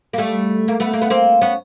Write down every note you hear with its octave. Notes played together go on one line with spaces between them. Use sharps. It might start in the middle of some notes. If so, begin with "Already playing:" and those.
A#3
G3 A3
A#3
A3 B3
A#3
B3
A#3 C4
B3 C#4